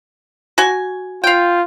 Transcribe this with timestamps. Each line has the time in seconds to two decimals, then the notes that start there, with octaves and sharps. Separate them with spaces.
0.58 F#4 G#5
1.24 F4 F5 G5